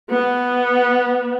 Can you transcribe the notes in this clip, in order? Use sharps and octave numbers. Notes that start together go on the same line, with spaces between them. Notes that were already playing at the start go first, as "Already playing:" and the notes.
B3